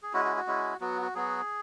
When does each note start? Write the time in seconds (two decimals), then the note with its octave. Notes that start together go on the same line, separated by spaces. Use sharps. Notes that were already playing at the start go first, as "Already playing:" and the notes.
0.02 G#4
0.13 G#3 C#4 E4 F#4
0.25 F#4
0.36 F#4
0.47 G#3 C#4 E4
0.81 F#3 B3 F#4
1.02 F#4
1.14 F#3 B3 F#4 G#4